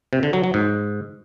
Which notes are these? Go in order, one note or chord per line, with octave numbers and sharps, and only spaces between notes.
C3
D3
F#3
F#3
G#2